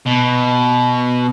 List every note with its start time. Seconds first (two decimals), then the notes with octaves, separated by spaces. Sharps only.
0.06 B2